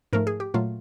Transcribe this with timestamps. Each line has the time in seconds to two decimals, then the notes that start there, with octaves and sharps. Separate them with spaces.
0.13 G#2 F3 A3 A#4
0.27 G#4
0.40 G4
0.54 A#2 F#3 A3 F4